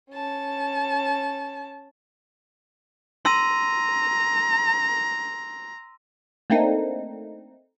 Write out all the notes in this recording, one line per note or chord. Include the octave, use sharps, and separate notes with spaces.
C#4 A5
A#5 C6 E6 D#7
A3 A#3 C4 D4 D#4